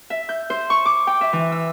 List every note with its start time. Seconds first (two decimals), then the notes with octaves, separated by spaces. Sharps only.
0.10 E5
0.29 G6
0.50 C5
0.70 C#6
0.85 D6
1.07 G5
1.21 E5
1.33 E3
1.52 E6